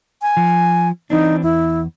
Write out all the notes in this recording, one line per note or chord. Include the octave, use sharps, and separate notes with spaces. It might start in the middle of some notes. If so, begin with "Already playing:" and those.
G#5
F3
E3 C4 D4 D#4
E2 E4